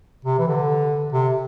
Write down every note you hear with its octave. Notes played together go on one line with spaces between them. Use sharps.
C3
E3
D3
C3